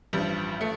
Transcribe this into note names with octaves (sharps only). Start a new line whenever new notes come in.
A1 G2 F3 G3
A3